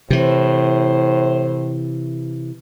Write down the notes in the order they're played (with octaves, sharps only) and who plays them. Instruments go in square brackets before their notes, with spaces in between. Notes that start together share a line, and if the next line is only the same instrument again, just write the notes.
[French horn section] A2 C5 [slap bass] C3 E3